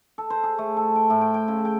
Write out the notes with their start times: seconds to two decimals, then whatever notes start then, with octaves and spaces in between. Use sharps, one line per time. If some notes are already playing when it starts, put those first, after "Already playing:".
0.18 A4
0.30 C5
0.43 G#4
0.58 A3
0.77 A4
0.96 G5
1.10 A2
1.21 G5
1.34 G5
1.48 C#3
1.65 G5